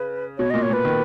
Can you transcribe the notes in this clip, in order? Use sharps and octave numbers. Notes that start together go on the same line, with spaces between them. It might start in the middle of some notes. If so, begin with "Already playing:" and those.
Already playing: C#3 B4
B2 C#5
A#2 D#5
C#5
A#2 B4
D#3